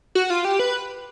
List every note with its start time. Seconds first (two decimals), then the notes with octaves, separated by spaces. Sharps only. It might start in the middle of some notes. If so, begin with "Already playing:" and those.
0.15 F#4
0.30 F4
0.45 G4
0.60 B4